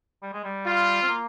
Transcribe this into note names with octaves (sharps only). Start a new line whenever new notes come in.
G3
G#3
G3
F4
C4
A#3